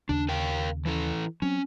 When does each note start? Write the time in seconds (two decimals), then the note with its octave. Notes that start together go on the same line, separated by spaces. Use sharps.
0.09 D#2 C#3 D4
0.29 A#4 F5 G5
0.85 E3 E4 A4
1.42 F#3 C4 C#4